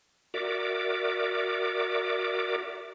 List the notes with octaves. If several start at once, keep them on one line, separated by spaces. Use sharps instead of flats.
F#4 A#4 D5 E5 D6